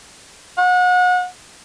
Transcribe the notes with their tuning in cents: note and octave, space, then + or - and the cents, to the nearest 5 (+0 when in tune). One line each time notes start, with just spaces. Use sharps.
F#5 -35